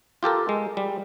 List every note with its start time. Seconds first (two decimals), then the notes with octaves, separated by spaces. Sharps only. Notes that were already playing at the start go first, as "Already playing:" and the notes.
0.23 F4 G4 A4 A#4
0.49 G#3
0.77 G3